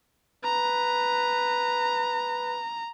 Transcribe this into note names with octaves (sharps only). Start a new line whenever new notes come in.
B4 A#5